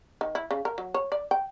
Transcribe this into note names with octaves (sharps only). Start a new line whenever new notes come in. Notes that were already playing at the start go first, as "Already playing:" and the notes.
D#3
E4
C#3
A#4
F#3
C#5
D5
G5